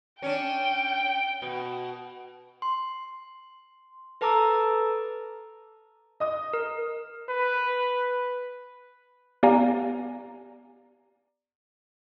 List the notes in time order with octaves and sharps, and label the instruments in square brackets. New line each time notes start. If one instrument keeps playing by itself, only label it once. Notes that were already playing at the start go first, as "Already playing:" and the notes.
[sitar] C#4 D4 [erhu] G5
[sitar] B2
[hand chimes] C6
A4 B4 A5 A#5 D6 E6
[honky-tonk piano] D#5 D#6
[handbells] A#4
[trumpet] B4
[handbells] B3 G4 D5 F5 G#5 A#5